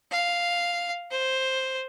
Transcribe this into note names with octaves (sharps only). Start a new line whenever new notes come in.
F5
C5